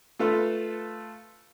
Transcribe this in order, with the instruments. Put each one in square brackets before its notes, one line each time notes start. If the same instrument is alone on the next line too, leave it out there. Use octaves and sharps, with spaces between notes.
[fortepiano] A3 F4 A4 B4 F5